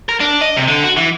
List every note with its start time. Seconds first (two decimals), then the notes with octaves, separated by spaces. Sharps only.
0.09 A#4
0.20 D4
0.41 D#5
0.57 C3
0.68 D3
0.84 F#4
0.97 E3